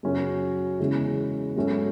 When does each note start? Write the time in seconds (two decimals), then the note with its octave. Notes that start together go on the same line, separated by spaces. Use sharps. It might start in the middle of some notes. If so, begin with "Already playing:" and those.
0.03 F#2 C#3 F#3 C#4 F#4
0.80 E2 C#3 G#3 C#4 E4
1.56 G#2 F#3 A3 C#4 F#4